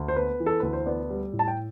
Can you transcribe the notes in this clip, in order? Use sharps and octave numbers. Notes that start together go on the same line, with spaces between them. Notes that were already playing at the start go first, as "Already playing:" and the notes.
Already playing: D2
C5
B3 B4
E3
A4
D2 B4
C5
B3 D5
G3
A2
A5
G5